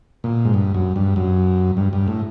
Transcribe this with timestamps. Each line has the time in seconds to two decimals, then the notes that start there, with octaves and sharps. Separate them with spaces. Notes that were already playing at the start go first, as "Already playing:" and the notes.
0.24 A#2
0.45 G#2
0.54 G2
0.74 F#2
0.96 G2
1.16 F#2
1.77 G2
1.93 G2
2.08 A2